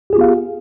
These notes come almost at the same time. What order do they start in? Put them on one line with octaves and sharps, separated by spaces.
G4 G#4 F4 B3 F5